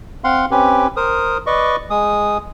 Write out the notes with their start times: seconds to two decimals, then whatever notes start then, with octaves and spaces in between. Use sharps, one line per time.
0.24 C4 F5 F#5 C6
0.51 C4 C#4 G4 B4
0.97 A#4 C5 D#6
1.47 B4 D5 D#5 C#6
1.90 G#3 D#6